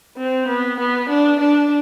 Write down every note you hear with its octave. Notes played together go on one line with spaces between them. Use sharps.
C4
B3
B3
D4
D4